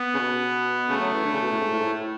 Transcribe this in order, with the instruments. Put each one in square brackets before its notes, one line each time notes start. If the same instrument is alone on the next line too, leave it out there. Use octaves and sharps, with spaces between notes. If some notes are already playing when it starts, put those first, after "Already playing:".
Already playing: [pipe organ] B3
[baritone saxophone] C#3
B2
[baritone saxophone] C#3 [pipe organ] A3
[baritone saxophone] F#3
E3
D3
C#3
B2
A2
G#2
A2
G#2
A2